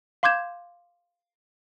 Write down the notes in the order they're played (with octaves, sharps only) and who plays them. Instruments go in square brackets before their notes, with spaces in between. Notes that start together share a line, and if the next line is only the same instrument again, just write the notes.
[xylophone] F5 C6 D6 G6 G#6 E7